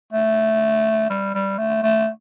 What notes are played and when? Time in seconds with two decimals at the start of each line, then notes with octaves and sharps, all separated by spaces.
0.13 A3
1.10 G3
1.34 G3
1.58 A3
1.83 A3